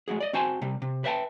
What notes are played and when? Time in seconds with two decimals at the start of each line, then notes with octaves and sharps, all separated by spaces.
0.08 G#3 A3 F#4 G#4
0.20 D5 D#5
0.33 C4 F#4 C5 G#5 A5 C6
0.62 C3 G3
0.82 C3
1.04 B4 C5 E5 F#5 G5 A5